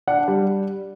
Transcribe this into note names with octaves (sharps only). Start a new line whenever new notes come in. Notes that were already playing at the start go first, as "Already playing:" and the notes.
D4 F#5
G3